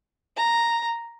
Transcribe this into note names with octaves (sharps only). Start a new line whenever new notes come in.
A#5